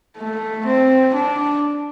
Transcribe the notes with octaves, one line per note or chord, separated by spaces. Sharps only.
A3
C4
D4